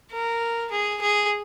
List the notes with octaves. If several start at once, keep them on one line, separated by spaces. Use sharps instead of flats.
A#4
G#4
G#4